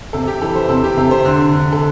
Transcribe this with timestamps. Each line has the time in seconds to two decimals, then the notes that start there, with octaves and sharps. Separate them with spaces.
0.13 C3 A4
0.27 G4
0.42 E3 A4
0.55 C5
0.69 C3 A4
0.84 G4
0.97 C3 A4
1.11 C5
1.25 D3
1.53 D3
1.73 A4